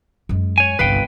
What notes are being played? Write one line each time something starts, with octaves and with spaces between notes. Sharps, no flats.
F#2 G#3
C#5 G#5
G1 C2 B4 F5 G5